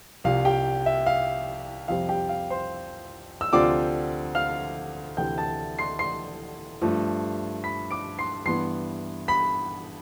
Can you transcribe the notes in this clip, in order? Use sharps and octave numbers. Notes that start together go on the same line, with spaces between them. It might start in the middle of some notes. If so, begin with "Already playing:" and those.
C2 C3 F3 F5
G4 G5
E5
F5
F2 C3 G3 C4 F5
G4 G5
F5
C5 C6
E6
D2 C3 F3 C4 F4 D5 D6
F5 F6
D2 C3 E3 G5 G6
A5 A6
C6 C7
C6 C7
G2 F3 A3
B5 B6
D6 D7
C6 C7
G2 E3 B3 C6 C7
B5 B6